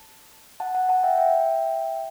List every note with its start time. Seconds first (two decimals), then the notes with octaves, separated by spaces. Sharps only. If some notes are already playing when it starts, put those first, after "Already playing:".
Already playing: A5
0.60 F#5 A5
0.75 F#5 A5
0.89 F#5 A5
1.03 E5 G5
1.18 E5 G5